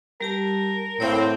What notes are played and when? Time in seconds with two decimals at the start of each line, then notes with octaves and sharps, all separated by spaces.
0.21 G3 G4 A#4 A5
1.00 A2 A#3 C4 C#5 E5 F#5